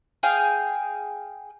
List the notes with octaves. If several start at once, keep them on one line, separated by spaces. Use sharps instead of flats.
G#4 F5 G5